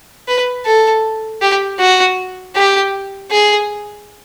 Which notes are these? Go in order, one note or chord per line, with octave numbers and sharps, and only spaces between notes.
B4
A4
G4
F#4
G4
G#4